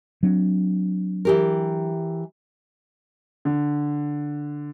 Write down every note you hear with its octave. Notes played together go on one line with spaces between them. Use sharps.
F#3 C4 D4
E3 G4 A#4
D3